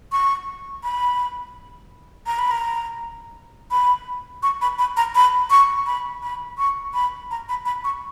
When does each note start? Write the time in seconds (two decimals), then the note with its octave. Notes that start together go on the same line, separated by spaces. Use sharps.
0.12 C#6
0.83 B5
2.27 A#5
2.39 B5
2.51 A#5
3.71 B5
4.43 C#6
4.61 B5
4.79 B5
4.97 A#5
5.15 B5
5.50 C#6
5.87 B5
6.23 B5
6.58 C#6
6.94 B5
7.31 A#5
7.49 B5
7.66 B5
7.84 C#6